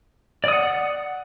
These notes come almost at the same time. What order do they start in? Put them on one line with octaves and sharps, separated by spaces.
D5 D#6 F#5